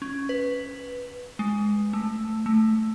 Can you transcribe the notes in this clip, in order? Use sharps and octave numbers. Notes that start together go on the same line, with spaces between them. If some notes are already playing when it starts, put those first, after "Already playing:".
C#4
B4
G#3
A3
A3